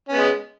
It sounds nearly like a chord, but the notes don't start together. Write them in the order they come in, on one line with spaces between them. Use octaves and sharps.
C#4 B3 G#3